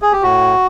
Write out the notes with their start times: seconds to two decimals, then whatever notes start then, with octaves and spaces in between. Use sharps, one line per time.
0.02 G#4
0.13 G4
0.23 A2 F#4